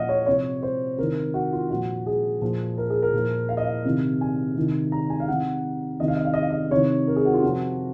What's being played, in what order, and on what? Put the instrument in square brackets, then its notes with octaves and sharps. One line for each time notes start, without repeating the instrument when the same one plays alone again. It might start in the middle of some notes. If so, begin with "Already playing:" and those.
Already playing: [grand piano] A#2 F3 D#5 F5 F#5
C#5
C3 F3 C#5
C5
C3 D#3 A#4
F#4
F4
A#2 F3 F#4
G#4
A#2 F3
A#4
G#4
A#4
A#2 F3
F5
D#5
F5
C3 D#3
G#5
C3 D#3
A#5
G#5
F5
C3 D#3 F#5
C3 D#3 D#5
F5
D#5
F5
D#5
F5
D#5
C3 D#3 C#5
A#4
G#4
F#4
F4
C3 F3 F#4